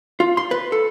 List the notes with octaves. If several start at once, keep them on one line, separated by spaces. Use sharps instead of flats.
F4
C6
B4
A4